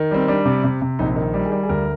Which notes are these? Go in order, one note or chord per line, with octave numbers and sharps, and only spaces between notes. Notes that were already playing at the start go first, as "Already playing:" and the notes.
Already playing: D#3
G3 C4
G3 D4
C3
C3
C3
A#1 D#4
D#3
G3
G#4
G3
G#4
D2 A#4